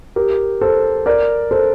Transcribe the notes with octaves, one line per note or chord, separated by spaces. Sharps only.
G4 A#4
A4 C5
A#4 D5
A4 C5